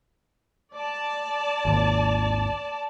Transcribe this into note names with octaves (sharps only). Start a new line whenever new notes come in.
D5 A5
G#1 D#2